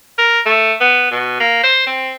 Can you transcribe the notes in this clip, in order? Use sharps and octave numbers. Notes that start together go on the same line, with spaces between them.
A#4
A3
B3
B2
A#3
C5
C4